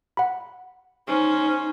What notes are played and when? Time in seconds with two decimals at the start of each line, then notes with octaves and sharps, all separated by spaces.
0.17 F#5 B5
1.08 C#4 D#4 C5